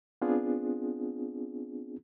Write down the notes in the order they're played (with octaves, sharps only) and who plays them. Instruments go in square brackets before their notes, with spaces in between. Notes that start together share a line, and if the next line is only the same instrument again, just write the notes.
[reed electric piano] B3 C4 D4 F4 G#4